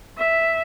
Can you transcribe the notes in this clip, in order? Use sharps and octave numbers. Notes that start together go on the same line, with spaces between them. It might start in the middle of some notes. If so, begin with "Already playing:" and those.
E5